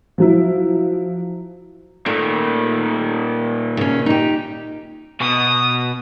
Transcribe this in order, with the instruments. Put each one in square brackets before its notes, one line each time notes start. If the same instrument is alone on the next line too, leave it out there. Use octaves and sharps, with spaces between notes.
[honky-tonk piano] F3 F#3 E4
[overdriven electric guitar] A#2 D#3 [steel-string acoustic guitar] A3
[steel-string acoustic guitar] C#3 C#4
D#4 G4
[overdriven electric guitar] B2 [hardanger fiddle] D#6